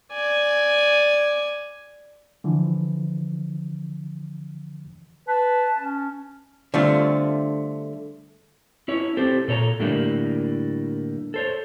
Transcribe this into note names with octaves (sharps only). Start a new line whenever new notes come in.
D5 G#5
D3 E3 F3
B4 A5
C#4
D3 G3 A3 C4 F4
C#4 E4 C#5
C4 G4 A4 C5
A#2 A4 C#5 A5 A#5
A2 D3 G3 A#3 E4
A4 C5 C#5